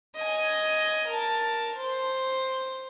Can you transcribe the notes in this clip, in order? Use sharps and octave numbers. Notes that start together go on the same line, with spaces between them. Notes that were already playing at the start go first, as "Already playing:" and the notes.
D#5 G#5
A#4 A5
C5